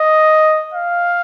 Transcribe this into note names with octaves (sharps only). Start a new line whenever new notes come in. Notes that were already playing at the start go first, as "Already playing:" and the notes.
Already playing: D#5
F5